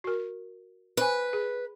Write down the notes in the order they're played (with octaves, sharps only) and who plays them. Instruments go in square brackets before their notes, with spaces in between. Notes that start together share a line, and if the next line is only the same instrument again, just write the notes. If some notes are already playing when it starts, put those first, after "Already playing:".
[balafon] F#4 A#4
[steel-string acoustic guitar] B4 [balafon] C5 G#5
[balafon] G#4